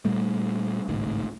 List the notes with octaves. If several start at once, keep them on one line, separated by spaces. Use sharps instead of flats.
A#2 G3 A3
G#1 C#2 A2 D#3